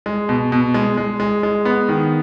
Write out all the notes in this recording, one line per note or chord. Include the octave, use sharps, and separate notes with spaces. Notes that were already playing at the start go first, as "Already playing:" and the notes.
G#3
B2
B2
G#3
G#3
G#3
G#3
B3
D#3